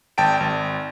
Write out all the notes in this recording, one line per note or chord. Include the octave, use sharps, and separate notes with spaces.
G#1 G5 A5 D7
G#1